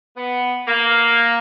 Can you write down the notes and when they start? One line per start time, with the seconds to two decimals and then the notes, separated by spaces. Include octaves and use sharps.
0.17 B3
0.68 A#3